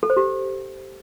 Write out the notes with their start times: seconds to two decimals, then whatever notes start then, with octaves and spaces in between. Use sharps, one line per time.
0.03 A4
0.10 C5
0.17 G4